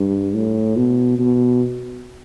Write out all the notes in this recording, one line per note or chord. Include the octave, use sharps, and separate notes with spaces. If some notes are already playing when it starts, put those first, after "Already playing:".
Already playing: G2
A2
B2
B2